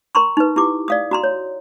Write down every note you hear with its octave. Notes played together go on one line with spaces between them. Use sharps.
A#4 A#5 C6 C#6
D#4 B4
E4 G4 D6
D5 F5 D#6
F#4 A#5 C6
C#5